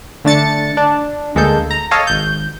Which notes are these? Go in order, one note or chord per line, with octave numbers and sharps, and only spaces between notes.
D3 A3 D4 A6 C#7
D4
D2 G#3 A#3 A4 G6
A#5
A4 C#5 D#5 F5
G#1 G6